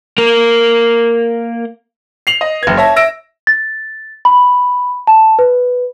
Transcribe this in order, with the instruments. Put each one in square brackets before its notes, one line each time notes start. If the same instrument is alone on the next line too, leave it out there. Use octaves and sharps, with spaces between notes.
[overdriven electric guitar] A#3 A#4
[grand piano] C7 F7 F#7
D#5
[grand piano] F#1 G#6 [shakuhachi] B4
[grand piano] C#5 E5 A#6 [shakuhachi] A5
[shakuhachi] E5 [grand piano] E6 A#6 D7
[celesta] A6
B5
A5
B4